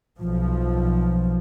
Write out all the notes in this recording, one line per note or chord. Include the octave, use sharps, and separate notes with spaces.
B1 F3